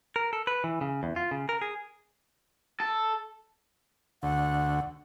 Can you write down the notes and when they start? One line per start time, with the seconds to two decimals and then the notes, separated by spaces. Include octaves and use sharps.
0.16 A#4
0.33 A4
0.47 B4
0.64 E3
0.81 C#3
1.03 E2
1.16 F4
1.31 C#3
1.49 A#4
1.61 G#4
2.80 A4
4.23 D2 F#5